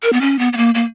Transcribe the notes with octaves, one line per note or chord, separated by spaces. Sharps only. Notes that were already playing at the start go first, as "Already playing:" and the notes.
A#4
B3
C#4
B3
B3
A#3
A#3